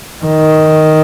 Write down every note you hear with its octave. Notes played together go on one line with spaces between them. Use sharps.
D#3